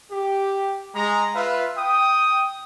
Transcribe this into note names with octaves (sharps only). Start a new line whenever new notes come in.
G4
G#3 A#5
F4 B4 E5 F5
G5 D#6